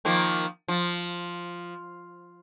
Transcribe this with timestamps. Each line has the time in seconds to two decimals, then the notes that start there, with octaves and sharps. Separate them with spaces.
0.05 D#3 F3 A#3
0.68 F3